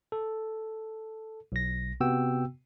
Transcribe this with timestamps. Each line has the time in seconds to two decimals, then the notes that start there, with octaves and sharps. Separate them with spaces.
0.12 A4
1.52 B1 A#6
2.00 C3 B3 F#4 G5 E6